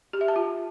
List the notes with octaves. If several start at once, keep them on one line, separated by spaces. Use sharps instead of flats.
G4
E5
A5
F4